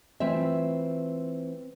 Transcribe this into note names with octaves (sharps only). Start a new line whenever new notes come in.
E3 A3 C4 F4 E5